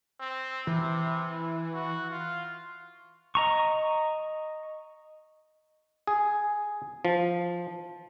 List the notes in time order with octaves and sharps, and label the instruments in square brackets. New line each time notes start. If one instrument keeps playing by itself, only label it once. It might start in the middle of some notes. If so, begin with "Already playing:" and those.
[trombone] C4
[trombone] C3 [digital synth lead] E3
[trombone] F#4
F4
[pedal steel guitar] D#5 A#5 C#6
[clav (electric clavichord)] G#4
F3